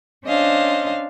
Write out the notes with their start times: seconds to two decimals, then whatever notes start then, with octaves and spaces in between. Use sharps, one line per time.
0.24 C#4 D4 C5 D#5 F5